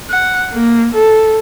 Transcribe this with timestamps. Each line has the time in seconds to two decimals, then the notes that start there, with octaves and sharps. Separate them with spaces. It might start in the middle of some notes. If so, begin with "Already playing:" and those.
0.10 F#5
0.53 A#3
0.94 A4